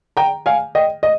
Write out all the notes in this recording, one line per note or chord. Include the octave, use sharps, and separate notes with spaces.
G5 A#5
F5 G#5
D#5 G5
D#5